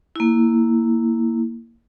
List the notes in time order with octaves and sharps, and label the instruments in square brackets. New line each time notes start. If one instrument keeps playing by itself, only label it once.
[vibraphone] A#3 E4